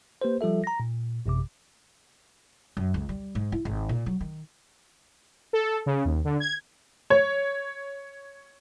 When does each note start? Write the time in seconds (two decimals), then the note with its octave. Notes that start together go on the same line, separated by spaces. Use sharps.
0.22 A#3 G4 B4 C5
0.41 F3 G3 F4 A4 E5
0.64 A#5 A#6
0.80 A#2
1.26 A1 F#2 C3 D6
2.77 F#2
2.94 C#2
3.09 G3
3.35 G#2
3.52 E4
3.65 G#1
3.89 A#2
4.06 F#3
4.21 D#3
5.53 A4
5.86 C#3
6.05 D#2
6.24 D3
6.40 G#6
7.10 C#5